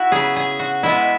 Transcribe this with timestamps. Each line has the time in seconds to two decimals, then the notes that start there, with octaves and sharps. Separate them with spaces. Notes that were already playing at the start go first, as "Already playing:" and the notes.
Already playing: E4 F#4
0.12 C#3 F#3 B3 G#4
0.36 G#4
0.59 F#4
0.83 B2 G#3 B3 E4